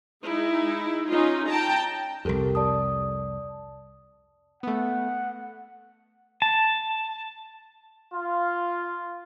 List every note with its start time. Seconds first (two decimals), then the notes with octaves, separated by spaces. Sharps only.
0.24 G#3 D#4 E4
1.10 C#4 D#4 F4
1.48 G5 A5 A#5
2.25 C2 F2 G4 A4 A#4
2.55 D5 A5 D#6
4.63 A3 B3 F#5
6.42 A5
8.14 F4